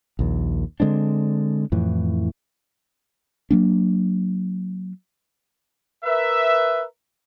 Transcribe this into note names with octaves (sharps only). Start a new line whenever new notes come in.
A#1 D#2
D3 G#3 C4 D4
F2 A2 E3
F#3 A#3 D4
A#4 B4 E5